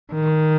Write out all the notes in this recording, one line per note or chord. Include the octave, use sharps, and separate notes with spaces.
D#3